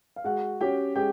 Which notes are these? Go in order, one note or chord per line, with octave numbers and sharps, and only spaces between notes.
F5
G#3 F#4 F#5
C#4 F#4 G4 G5
G#3 G4 G5